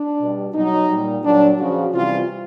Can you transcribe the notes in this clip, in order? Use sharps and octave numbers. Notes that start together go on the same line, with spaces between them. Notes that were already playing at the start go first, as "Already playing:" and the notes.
Already playing: D4
B2 G3
B2 F#3 D#4
A#2 G3
A#2 F#3 D4
C#3 F3 F#4
C3 E3 G3 F4